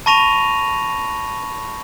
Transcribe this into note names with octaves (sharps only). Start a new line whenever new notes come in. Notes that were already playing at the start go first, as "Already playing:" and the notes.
A5 B5 C#6 A#6 D#7 F7